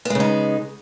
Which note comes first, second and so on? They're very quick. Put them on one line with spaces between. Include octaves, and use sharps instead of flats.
B3 G#3 C#3 D#4